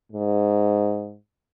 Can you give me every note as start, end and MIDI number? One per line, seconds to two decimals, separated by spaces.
0.12 1.16 44